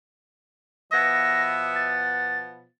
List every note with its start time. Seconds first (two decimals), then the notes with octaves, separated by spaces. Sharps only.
0.92 B2 F3 B3 E5 A#6
1.75 A6